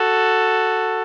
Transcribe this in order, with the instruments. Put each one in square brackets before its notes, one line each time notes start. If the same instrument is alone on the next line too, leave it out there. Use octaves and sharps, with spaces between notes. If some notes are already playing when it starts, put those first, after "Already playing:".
Already playing: [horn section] F#4 A4